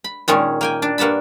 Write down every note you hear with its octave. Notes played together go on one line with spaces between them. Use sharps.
B5
A#2 D#3 G#3 C#4
A#3 G5 G#5
D4
G2 A#3 F#5 A5 B5